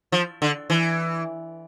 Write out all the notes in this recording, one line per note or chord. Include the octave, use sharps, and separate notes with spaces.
F3
D3
E3